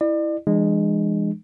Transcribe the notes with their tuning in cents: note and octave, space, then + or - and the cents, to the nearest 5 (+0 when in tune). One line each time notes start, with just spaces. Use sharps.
E4 +0 D5 +40
E3 +35 G#3 -10 D4 +40